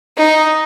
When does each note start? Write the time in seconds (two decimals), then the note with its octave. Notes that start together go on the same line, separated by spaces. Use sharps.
0.17 D#4